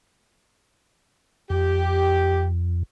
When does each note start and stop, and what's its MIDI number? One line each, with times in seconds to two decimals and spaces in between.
1.50 2.83 41
1.50 2.45 67